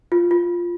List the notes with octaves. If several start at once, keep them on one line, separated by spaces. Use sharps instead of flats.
F4
F4